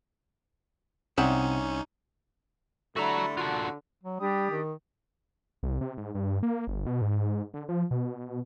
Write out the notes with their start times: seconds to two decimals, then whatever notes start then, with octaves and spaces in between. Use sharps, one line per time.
1.17 C2 C3 C#4 D#4 E5 F#5
2.96 D3 G3 A3 E4 F#4 A#5
3.37 D4 F4 F#4
4.03 F#3
4.20 G3 D4 G4 D#6
4.51 D#3
5.63 C2
5.81 C3
5.98 G#2
6.15 G2
6.43 A#3
6.67 G1
6.86 B2
7.01 G#2
7.54 D3
7.69 F3
7.91 B2